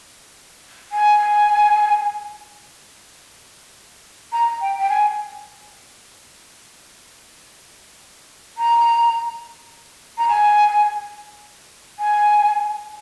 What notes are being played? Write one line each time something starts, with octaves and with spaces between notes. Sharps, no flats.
G#5
A#5
G5
G5
G#5
A#5
A#5
G#5
G#5